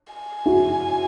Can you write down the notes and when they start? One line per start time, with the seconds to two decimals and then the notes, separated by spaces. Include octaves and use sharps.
0.14 G#5
0.46 E4 F#4